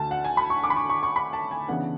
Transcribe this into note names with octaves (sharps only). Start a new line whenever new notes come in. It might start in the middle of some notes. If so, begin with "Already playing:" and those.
Already playing: D2 D3 A3 A5
F#5
G#5
B5
C#6
D6
B5
C#6
C#6
C#6
B5
A5
G#5
C#3 E3 B3 D4 F#5